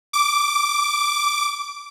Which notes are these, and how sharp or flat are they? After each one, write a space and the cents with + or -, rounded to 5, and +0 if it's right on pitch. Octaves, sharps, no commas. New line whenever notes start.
D6 -10